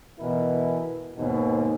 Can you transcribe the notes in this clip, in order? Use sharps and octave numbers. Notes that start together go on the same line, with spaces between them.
B2 E3 E4 A#4
D#2 G#2 B2